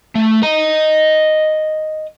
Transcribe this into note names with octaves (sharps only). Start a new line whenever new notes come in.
A3
D#5 A#5